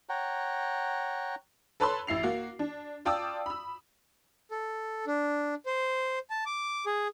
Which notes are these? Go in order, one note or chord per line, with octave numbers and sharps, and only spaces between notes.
C#5 F#5 G5 A#5
A4 B4 C#5 A5 B5 C6
A1 E4 C7 F7
A#3 F#4
D4
F4 D5 G5 A5 D#6 E6
B5 E6
A4
D4
C5
A5
D6
G#4